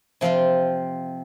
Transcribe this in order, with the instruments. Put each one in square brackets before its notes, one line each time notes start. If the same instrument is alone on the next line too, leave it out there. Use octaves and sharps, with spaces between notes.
[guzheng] C3 F3 C4 F4